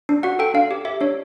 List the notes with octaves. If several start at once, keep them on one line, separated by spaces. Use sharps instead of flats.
D4
F#4 F#5
A4 G5
D4 F5
G4
G4 E5
D4 C#5